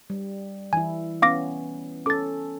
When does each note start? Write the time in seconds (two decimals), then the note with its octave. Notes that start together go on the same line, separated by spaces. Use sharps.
0.10 G3
0.73 E3 E4 G#5
1.22 B3 C#4 F5 D6 A#6
2.06 C#4 A4 D6 A6